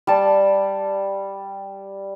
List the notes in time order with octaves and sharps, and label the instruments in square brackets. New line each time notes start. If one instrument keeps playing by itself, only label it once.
[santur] G3 A5